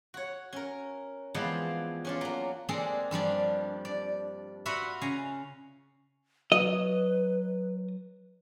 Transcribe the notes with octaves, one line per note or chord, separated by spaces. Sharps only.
F#4 C#5
C#4 A#4
E3 F3 G#3 B3 C4 D4
C#4 D4 F4
F#3 A#3
G#3 A#3 C4 D4 G#4 A4
G2 F3 G3 D4
D5
F4 F#4 B4 E5 F#5
C#3 F5 G#5 A#5
F#3 B4 D#5